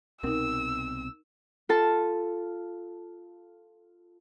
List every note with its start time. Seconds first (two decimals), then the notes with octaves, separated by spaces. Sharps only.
0.23 C2 B2 C4 D#4 A#4 E6
1.69 F4 A4 A5